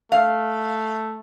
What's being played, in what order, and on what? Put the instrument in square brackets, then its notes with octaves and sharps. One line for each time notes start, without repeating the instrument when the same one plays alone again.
[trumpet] A3 [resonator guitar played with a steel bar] F5